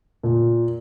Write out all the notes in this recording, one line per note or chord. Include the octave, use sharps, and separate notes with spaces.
A#2